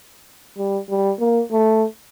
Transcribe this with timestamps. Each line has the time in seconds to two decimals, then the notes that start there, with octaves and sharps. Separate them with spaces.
0.57 G3
0.89 G3
1.20 A#3
1.52 A3